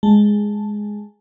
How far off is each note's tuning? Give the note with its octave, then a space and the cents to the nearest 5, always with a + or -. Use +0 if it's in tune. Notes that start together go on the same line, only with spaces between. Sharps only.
G#3 +0 A5 +0